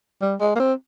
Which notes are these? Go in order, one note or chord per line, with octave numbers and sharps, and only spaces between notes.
G3
G#3
A#3
C4